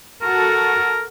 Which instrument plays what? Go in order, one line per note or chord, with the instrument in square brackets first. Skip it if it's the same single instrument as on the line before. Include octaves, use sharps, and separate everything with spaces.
[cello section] F#4 A4 [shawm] A#4